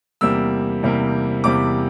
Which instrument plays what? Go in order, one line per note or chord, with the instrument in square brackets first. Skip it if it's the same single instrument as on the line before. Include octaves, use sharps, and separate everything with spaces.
[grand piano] E2 C3 G3 A#3 E6
E2 C3 G3 A#3
E2 C3 G3 A#3 D6